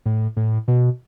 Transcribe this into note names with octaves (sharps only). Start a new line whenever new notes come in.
A2
A2
B2